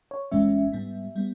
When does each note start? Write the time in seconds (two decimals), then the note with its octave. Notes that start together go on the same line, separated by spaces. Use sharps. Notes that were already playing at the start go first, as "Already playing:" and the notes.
0.11 C#5
0.32 G1 G2 E3 G#3 C#4 E5
0.72 G#2 G3 B3
1.16 G3 B3